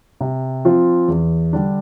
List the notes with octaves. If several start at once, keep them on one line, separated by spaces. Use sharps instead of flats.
C3
F3 C4 F4
E2
D3 G3 D4